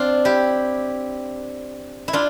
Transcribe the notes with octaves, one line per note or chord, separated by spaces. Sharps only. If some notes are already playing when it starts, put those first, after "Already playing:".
Already playing: C4 D4 F4
E4 G4
E4
D4 F4